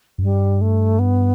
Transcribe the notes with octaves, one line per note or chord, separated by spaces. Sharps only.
F#2
G2 G3
A3
B3